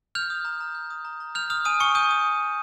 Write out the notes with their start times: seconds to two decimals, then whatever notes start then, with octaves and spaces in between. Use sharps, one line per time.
0.15 F6 G6 F7
0.30 D#6
0.45 A#5
0.60 A#5
0.75 G6
0.90 D#6
1.05 A#5
1.20 A#5
1.35 F6 G6 F7
1.50 D#6 F6 F7
1.65 G#5 D#6 D#7
1.80 G#5 C#6 C#7
1.95 D#6 G6 D#7
2.11 D#6